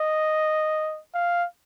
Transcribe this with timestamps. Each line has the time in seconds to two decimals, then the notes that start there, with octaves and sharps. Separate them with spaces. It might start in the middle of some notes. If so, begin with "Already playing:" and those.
Already playing: D#5
1.15 F5